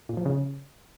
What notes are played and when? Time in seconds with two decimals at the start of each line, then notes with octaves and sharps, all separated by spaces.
0.09 A#2
0.17 F3
0.25 C#3